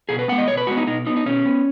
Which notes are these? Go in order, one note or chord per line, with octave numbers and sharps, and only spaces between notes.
B2 G#4
B4
G#3 B3 F#5
D#5
B2 C#5
B4
G#3 B3 F#4
D#4
B2 D#4
B3 D#4
D#4
B2 C#4
B3